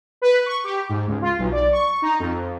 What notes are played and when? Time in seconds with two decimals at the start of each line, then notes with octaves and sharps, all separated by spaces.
0.22 B4
0.46 C#6
0.64 G4
0.89 G#2
1.08 C#2
1.22 F4
1.39 B1
1.52 D5
1.72 C#6
2.02 D#4
2.19 F2